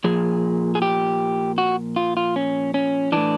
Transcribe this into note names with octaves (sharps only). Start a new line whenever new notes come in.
A#2 F3 G#4
G#4
G4
F#4
F4
F4
C#4
C#4
A2 E3 D4